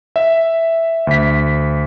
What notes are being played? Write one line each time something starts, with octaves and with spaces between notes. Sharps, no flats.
E5
D2 B6